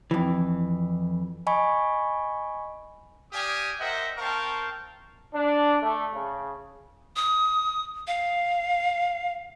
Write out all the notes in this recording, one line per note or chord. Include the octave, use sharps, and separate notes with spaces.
F2 E3
D#5 G#5 B5 C#6
G4 D5 F5 G#5 D#6
A#4 C5 D#5 E5 F#5 G5
C4 A#4 F5 G5 A5 C#6
D4
A3
C#3
D#6
F5